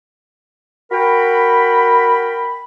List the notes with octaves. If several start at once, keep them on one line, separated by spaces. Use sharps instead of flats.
F#4 A#4 G5 B5